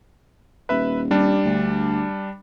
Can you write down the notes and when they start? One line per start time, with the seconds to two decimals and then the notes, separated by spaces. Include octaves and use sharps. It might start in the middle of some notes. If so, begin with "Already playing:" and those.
0.69 D#1 B4 E5 B5
1.11 G3 D4
1.45 D2